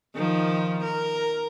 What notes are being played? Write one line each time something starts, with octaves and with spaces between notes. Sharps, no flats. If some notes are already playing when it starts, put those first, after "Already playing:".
D#3 F3
A#4